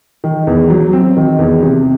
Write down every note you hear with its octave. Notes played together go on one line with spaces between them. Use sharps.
D#3
E2
F#3
C4
D#3
E2
C3